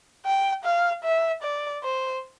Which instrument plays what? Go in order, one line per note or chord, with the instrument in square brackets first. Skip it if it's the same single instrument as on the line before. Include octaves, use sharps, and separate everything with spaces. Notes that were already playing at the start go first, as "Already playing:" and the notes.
[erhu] G5
F5
E5
D5
C5